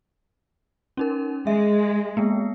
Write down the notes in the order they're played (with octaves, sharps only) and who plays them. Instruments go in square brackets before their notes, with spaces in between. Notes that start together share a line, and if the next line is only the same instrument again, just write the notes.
[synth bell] C#4 D#4 A#4
[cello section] G#3 [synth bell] E5
[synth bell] G#3 A#3 B3